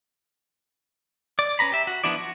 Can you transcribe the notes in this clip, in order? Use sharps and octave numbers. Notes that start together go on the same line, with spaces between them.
D5
C#4 B4 A#5 B5
G4 E5
F#4
F3 B3 D4 E4 D5
F#4